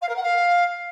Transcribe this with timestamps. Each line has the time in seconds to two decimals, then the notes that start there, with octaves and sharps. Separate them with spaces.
0.01 F5
0.09 A#4
0.16 F#5
0.23 F5